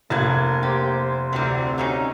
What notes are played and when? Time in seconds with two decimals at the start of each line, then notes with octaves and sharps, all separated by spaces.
0.10 F1 G2 A#3 F#5 A5 G#6
0.63 G4 C5
1.33 D2 C3 E3 F#3 G3 C4
1.78 F#2 A#2 C#4 D#4